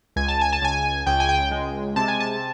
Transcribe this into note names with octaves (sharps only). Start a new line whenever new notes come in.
C#2 G#5
A5
G#5
A5
C#2 G#5
C#2 G5
G#5
G5
G#3
C3 A5
G#5
A5